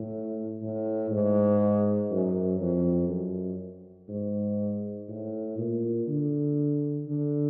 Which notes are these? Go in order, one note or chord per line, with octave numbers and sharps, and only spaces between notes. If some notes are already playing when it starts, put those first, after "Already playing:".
Already playing: A2
A2
G#2
F#2
F2
F#2
G#2
A2
A#2
D3
D3